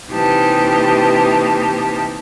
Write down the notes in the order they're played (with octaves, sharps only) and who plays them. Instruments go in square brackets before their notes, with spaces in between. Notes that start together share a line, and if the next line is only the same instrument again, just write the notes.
[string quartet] C3 E3 A#3 D#4 G4 A5